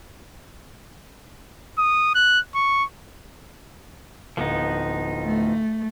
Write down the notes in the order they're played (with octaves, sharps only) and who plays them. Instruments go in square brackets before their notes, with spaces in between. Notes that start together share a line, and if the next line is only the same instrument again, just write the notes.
[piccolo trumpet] D#6
F#6
C#6
[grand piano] D1 [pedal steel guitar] F3 B3 D#4
[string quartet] A3